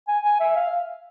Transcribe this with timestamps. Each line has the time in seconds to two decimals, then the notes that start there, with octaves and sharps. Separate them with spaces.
0.08 G#5
0.24 G#5
0.40 E5
0.56 F5